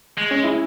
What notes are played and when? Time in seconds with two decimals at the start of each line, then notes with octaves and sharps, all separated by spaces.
0.17 G#3
0.31 C#4
0.44 E4